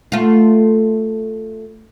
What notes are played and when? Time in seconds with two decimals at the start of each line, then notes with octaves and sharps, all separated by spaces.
0.12 A3 F4